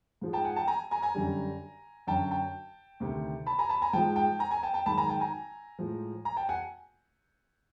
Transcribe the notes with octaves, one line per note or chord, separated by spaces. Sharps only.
G#2 F3 G#3
G5 A5
F#5 G#5
G5 A5
G#5 A#5
G#5 A#5
G#5 A#5
F#2 D3 G3
F#2 D3 F#3 G5 A5
G5 A5
D2 C3 D#3
A5 B5
G#5 A#5
A5 B5
G#5 A#5
G#2 F3 G#3 G5 A5
G5 A5
G#5 A#5
G#5 A#5
G5 A5
G5 A5
G#2 D#3 F#3 A5 B5
G#5 A#5
G5 A5
G#5 A#5
A2 F3 G#3
G#5 A#5
G5 A5
F#5 G#5